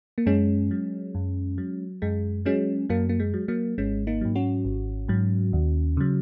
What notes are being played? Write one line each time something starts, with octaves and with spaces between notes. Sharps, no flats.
A#3
F#2 G#3 C#4
F#3
F#2
F#3
F#2 G#3
F#3 G#3 C#4
F#2 F#3 A#3
A#3
G#3
F#3
F#3 A#3
G#1 G#3 C#4
A#3 D#4
G#2 F#3
C#4 F#4
G#1
G#2 F#3
D#2
C#3 F#3